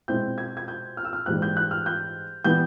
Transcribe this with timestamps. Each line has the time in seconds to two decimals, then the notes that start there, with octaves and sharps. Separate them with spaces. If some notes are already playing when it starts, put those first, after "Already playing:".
0.08 B2 G#3 C4 E4 G6
0.38 G#6
0.57 G#6
0.68 G6
0.97 F6
1.05 E6
1.13 F6
1.26 G#2 E3 G3 F#6
1.42 G6
1.57 F#6
1.71 F6
1.86 G6
2.44 E3 G3 B3 G6